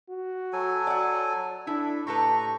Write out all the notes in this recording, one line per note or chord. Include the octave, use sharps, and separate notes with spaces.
F#4
F#3 A4 G#5
D5 F#5
D4 E4 A4
A2 G4 A4 B4 A#5 C#6